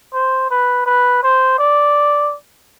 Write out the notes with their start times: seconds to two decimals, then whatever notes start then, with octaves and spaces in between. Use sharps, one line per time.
0.13 C5
0.51 B4
0.86 B4
1.23 C5
1.58 D5